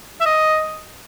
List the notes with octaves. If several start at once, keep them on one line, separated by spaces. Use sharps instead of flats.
E5
D#5